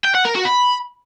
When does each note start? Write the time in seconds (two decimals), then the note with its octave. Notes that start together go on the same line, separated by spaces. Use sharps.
0.05 G5
0.15 F#5
0.25 A#4
0.35 F#4
0.45 B5